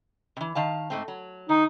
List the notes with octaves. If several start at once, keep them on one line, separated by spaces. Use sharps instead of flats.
C3 E3
D#3 F5 A5
G#2 A3 C4
F#3
D#3 D#4